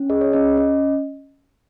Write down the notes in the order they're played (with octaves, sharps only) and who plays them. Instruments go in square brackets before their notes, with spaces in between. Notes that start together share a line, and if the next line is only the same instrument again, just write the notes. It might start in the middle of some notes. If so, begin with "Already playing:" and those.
Already playing: [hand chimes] C#4
G#4 D#5
C#5
C#4 D#5
C#4 D#5